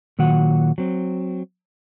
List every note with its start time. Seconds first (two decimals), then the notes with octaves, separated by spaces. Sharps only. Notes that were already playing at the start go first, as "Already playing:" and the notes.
0.19 A#2 D#3 F#3 F#4 F#5
0.78 F#3 C4